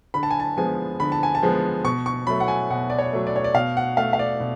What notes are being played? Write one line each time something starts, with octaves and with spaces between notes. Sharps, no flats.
D3 B5
A5
G#5
A5
F3 G#3 B3 G#5
D3 B5
A5
G#5
A5
F3 G#3 B3
B2 C#6
C#6
F#3 A3 B5
F#5
G#5
B2 F#5
D5
C#5
F#3 A3
D5
C#5
D5
B2 F5
F#5
A3 F5
F5
D5
B2